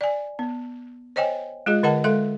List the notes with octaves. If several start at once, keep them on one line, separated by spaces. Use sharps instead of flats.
D5 G#5
B3
C5 C#5 D#5 G5 G#5
G#3 F4 G#4 D#5
D3 A#4 D#5 F#5 A5
G#3 A4 E5 C6